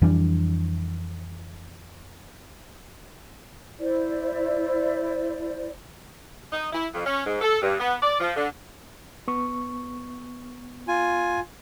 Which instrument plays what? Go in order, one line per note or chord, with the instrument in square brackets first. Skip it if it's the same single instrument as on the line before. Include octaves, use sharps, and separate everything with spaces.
[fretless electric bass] F2 E3 G3 D4
[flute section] E4 C5 D5
[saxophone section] D#4
E4
F2
C#4
G#2
A4
G2
B3
D5
F3
D3
[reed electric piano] B3 C#6
[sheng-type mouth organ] F4 G#5